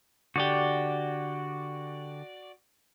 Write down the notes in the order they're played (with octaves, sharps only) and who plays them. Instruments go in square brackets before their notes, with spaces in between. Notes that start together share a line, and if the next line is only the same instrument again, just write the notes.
[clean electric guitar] D3 G4 [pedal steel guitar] F#4 D5